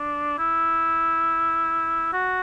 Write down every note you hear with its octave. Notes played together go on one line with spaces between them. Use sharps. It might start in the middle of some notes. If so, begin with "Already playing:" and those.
Already playing: D4
E4
F#4